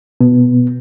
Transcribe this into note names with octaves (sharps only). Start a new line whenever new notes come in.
B2 B3